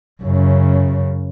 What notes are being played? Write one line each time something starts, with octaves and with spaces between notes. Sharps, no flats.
F#2 C#3